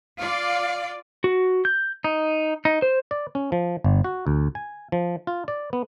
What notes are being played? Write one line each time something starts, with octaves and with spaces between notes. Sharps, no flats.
F4 D5 F5
F#4
G6
D#4
D#4
C5
D5
C#4
F3
G1
F#4
D2
G#5
F3
F4
D5
B3